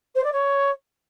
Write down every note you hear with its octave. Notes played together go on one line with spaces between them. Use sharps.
C5
D5
C#5